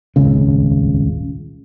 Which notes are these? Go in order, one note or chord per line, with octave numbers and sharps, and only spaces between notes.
D#1 G#1 C#2 C#3